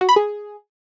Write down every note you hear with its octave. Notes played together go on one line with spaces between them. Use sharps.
F#4
B5
G#4